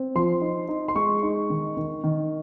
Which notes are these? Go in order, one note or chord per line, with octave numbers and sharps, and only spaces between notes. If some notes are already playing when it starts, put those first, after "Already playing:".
Already playing: C4
F3 C6
D#4
D#4
C6
G#3 C#6
D#4
D#3
D#3
D#3